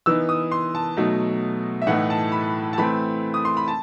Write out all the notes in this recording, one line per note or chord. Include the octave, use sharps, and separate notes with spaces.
E3 B3 D#4 E6
D#6
C6
A5
B2 F#3 A3 D#4
E5
A2 E3 A3 D#4 F#5
A5
B5
A5
E3 A3 C4 B5
D#6
C6
B5
A5